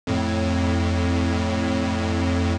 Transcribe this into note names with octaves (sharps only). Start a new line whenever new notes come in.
F2 A2